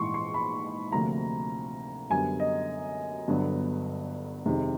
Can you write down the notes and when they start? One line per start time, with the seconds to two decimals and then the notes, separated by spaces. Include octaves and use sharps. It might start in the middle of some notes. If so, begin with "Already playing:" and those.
Already playing: A#1 G#2 E3 C6 C#6
0.14 C6
0.34 B5
0.92 D2 C3 F3 A#3 A#5
2.10 F#2 D3 G3 B3 G#5
2.40 D#5
3.28 G1 G2 D3 F#3 B3
4.46 F1 F2 C3 D#3 G#3